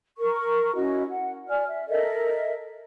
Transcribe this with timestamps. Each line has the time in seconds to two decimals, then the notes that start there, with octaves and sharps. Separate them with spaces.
0.18 A#4 C#6
0.74 C#4 E4 F#4 D#5
1.10 F#5
1.49 D5 G#5 F6
1.69 E5
1.89 A4 A#4 D#5 E5